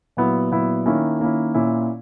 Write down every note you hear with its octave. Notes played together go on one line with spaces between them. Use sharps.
A#2 F#3 B3 E4
A#2 F#3 B3 E4
D#3 A#3 C#4 E4
D#3 A#3 C#4 E4
A#2 A#3 C#4 E4